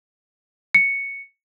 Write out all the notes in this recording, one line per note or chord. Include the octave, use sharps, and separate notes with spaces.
C#7